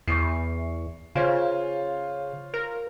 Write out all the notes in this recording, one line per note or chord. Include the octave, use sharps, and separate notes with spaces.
E2 C#6 C7
C#3 F4 C5 C#5
A#4